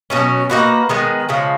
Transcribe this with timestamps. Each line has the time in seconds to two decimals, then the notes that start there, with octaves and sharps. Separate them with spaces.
0.10 B2 F#3 C#4
0.50 A#3 D#4 F#4 B4
0.89 D#3 G#3 B3
1.29 C#3 F3 G#3